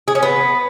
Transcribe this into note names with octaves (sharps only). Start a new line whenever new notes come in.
G#4
C#4
B3